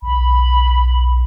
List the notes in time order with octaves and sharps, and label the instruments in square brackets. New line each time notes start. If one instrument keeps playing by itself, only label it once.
[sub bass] B1 [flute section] B5